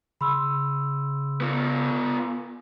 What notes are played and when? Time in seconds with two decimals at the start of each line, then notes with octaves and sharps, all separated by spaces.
0.21 C#3 B5 C6 E6
1.41 B3 F4